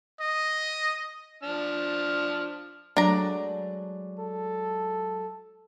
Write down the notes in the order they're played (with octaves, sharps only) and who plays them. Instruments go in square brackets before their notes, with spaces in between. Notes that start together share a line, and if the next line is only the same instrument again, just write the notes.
[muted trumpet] D#5
[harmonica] F3 D4 F6
[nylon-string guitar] F#3 G#3 A3 [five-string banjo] D4 A#5
[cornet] A4